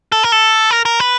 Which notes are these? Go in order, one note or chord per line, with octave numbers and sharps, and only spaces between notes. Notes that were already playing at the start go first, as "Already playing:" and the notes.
A4
A#4
A4
A#4
A#4
B4